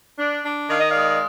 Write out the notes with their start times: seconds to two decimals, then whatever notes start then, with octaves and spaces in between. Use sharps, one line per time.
0.17 D4
0.44 D4
0.70 D#3 F5
0.79 D#5
0.89 D5 F5
0.95 G#3